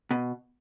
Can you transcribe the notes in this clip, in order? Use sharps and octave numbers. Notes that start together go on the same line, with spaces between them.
B2